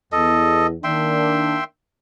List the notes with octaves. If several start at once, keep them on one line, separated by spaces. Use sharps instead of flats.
E2 A4 D#5
D#3 A#3 D4 E5 G5 C6